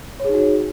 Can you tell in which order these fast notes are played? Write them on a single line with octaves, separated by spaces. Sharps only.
C#5 G#4 D#4 F#4